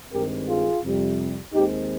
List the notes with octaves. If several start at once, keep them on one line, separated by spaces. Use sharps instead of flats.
G2 D#3 G#3 C4 G4 A#4
F4 G#4
F2 C3 G3
D#2 D#3 G#3 C4 D#4 G4